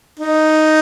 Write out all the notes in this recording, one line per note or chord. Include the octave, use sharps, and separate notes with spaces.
D#4